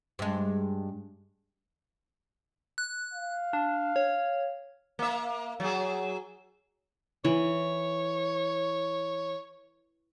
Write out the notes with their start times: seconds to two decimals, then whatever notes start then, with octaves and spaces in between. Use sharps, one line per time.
0.19 G2 G#3
2.78 F#6
3.14 F5
3.53 D4
3.96 C#5
4.99 A#3 E5
5.60 F#3 G#4
7.25 E3 C#5